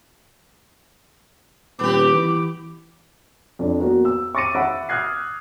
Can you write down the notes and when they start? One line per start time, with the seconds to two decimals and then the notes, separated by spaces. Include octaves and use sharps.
1.79 D#1 B3 G4 D6
2.14 E3
3.59 F2 D4
3.80 A#3 B3 F#4
4.05 E6
4.35 C#6 D6 A6 A#6 C#7 D#7
4.55 E5 F#5 B5 E6 D7
4.89 D#6 F6 F#6 G#6 C7